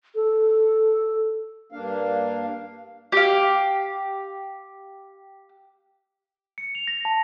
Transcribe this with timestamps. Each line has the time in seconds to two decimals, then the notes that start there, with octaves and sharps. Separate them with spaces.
0.15 A4
1.72 G2 A#3 D4 F5
3.12 G4 F5
6.58 C#7
6.75 F7
6.87 A#6
7.05 A5